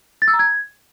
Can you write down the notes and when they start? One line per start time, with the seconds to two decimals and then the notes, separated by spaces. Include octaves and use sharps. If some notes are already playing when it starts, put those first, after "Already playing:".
0.22 A6
0.28 E6
0.33 A#5
0.39 G#6